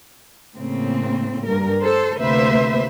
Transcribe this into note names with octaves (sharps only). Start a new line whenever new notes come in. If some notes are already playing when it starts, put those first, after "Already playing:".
A2 C#3 A#3 C4
G2 A#4
A4 C5
D2 C3 A#3 B4 C5 E5